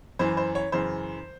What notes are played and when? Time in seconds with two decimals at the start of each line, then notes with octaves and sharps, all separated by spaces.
0.19 F#2 E3 C5
0.37 C5
0.55 C#5
0.72 F#2 C#3 E3 C5